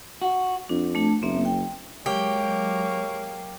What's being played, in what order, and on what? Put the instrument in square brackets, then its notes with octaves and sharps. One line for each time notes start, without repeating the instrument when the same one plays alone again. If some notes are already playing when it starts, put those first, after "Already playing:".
[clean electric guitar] F#4
[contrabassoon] F2 [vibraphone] D4
[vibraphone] A3 D4 A5
[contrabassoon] F#1 [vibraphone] A#3 C4 E5
[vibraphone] G5
[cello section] F#3 G#3 [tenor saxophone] A#3 [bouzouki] G4 [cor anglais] C#5